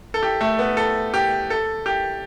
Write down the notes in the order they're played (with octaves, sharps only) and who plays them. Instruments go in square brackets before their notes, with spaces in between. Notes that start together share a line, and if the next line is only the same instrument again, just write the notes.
[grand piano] A4
G4
A3
B3
A4
G4
A4
G4